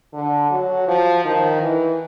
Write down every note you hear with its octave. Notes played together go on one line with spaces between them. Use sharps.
D3
F#3
F3
D#3
E3